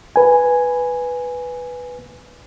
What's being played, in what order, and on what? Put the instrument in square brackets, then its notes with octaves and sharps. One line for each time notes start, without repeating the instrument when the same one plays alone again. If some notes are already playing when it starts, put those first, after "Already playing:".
[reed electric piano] B4 G#5